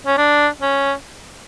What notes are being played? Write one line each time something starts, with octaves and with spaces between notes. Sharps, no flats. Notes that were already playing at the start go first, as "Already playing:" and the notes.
C#4
D4
C#4